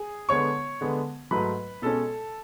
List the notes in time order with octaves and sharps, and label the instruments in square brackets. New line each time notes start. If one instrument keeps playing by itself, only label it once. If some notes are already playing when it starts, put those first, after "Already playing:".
Already playing: [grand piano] G#4
D3 G#3 B3 C#5 C#6
D3 G#3 B3
G#2 F#3 A3 B4 B5
B2 G#3 C#4 A4 A5